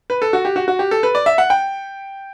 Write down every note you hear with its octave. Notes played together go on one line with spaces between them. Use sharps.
B4
A4
F#4
G4
F#4
F#4
G4
A4
B4
D5
E5
F#5
G5